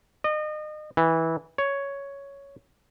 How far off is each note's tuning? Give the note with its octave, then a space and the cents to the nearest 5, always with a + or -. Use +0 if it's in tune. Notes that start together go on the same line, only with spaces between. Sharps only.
D#5 -35
E3 -15
C#5 +5